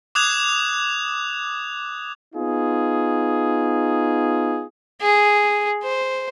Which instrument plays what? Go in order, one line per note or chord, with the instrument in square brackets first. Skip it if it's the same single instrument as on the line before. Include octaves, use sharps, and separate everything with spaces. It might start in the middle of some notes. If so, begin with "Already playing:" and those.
[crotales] D6 D#6 F#6 G#6 F7
[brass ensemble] B3 D#4 F4 G#4
[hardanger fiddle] G#4
C5